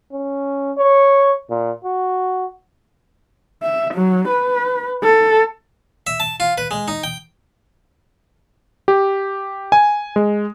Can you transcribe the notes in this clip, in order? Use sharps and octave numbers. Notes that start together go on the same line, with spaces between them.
C#4
C#5
A#2
F#4
E5
F#3
B4
A4
E5
A5
F4
B4
G#3
D#4
G5
G4
G#5
G#3